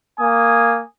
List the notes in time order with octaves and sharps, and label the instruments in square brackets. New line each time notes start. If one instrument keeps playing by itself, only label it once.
[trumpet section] A#3 G#5 D#6